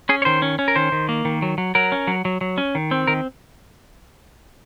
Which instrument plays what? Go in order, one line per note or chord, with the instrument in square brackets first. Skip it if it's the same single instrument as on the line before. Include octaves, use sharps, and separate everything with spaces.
[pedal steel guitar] C#4 G#4
C#5
D#3 C5
C#4
C#4
A#4
D#3 C5
D#3
A#3
D#3
F#3
F#3
F#3 A#4
C#4
F#3
F#3
F#3
C#4
D#3
C4
D#3 A#4